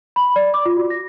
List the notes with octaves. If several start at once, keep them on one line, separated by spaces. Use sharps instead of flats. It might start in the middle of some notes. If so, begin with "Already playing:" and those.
B5
D5
D6
F4
F#4
A#6